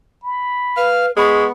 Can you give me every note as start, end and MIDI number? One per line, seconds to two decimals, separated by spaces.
0.24 0.88 83
0.77 1.11 71
0.77 1.06 77
0.77 1.06 89
1.17 1.46 56
1.17 1.52 59
1.17 1.48 83
1.17 1.46 85